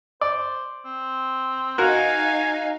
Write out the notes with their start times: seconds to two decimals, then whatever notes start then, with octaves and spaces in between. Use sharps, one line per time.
0.21 C5 D5
0.85 C4
1.78 D#4 F#4 A#4 F5 G#5